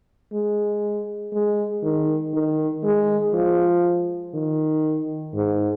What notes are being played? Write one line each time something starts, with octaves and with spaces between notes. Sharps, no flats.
G#3
G#3
D#3
D#3
G#3
F3
D#3
G#2